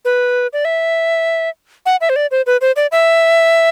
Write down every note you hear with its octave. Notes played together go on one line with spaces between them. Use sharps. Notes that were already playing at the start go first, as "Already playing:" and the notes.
B4
D5
E5
F#5
E5
C5
D5
C5
B4
C5
D5
E5